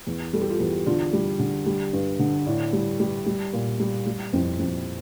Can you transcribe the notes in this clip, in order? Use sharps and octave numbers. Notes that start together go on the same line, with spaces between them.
E2
G3 A4
G4
F4 A4
E2
D3 D4 F4
G3
D3
G3
G2
D3
A2 D4
G3
G3
G3
A#2
G3
G3
F2 C4 E4
F2 C4